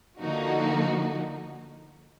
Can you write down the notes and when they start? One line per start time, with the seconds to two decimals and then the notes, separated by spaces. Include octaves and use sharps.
0.20 D3 F3 A#3 D#4 F#4